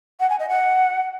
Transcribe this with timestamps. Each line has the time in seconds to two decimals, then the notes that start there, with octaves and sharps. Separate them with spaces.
0.20 F#5
0.30 G#5
0.39 D#5
0.49 F#5